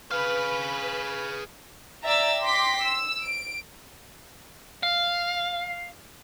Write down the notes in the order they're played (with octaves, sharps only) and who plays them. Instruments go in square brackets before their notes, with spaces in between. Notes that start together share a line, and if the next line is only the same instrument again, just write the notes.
[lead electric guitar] G#4 F5 [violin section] B4
[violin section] D5 E5 G5 A#5 E6 A6
G5 C6 D6 A#6 B6
E6
D7
[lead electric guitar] F5